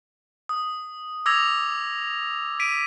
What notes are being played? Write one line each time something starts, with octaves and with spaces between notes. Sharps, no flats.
D#6
D6 E6 G#6 A#6 F7
B6 D7 D#7